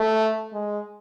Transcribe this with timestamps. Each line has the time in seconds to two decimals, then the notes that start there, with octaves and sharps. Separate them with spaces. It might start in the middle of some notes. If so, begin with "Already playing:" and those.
Already playing: A3
0.53 G#3